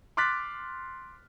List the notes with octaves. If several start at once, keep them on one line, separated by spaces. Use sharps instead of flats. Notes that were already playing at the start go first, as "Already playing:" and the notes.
C6 D6 F6 F#6 A6 B6